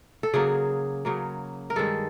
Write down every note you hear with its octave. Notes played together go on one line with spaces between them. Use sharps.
A4
C#3 F#3 A#3 G#4
C#3 F#3 A#3
A#4
G2 D#3 G#3 A4